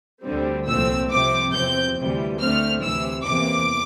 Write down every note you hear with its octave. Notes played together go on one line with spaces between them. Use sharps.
D2 D3 G3 C4
C2 A#2 F3 A3 C4 E6
C2 C3 F3 C4 D6
E2 C3 F3 C4 G6
D2 C3 E3 G3
D2 D3 A3 C4 F6
D2 C3 E3 E6
E2 C3 E3 A#3 D6